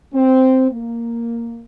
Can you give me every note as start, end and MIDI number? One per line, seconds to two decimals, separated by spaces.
0.13 0.67 60
0.71 1.64 58